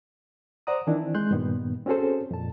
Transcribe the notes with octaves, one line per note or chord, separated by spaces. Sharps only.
C5 D5 F#5 A#5 D#6
D#3 E3 C4 D4 E4
G#3 C6 F#6 G6
G2 A#2 D#3 B3
C4 C#4 F#4 G#4 A4 C5
F2 A#2 A5